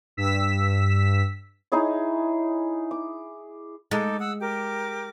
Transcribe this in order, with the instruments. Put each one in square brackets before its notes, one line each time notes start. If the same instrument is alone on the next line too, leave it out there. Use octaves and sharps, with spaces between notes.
[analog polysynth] G2 E6 B6
[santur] D#4 E4 G#4 C#5
D6
[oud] G#3 [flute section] D#4 A4 D6
[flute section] F#5 D#6 E6
G4 A#4 D6